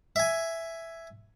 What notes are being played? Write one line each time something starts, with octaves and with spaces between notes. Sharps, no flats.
E5 G#5